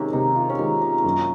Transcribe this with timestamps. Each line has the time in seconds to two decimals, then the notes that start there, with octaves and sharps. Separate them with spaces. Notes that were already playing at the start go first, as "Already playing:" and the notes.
Already playing: C3 D#3 G#3 A#3 C#4
0.13 C3 D#4
0.36 F4
0.50 C#4
0.59 D#3 G#3 D#4
0.82 D#4
1.04 F#2 A#3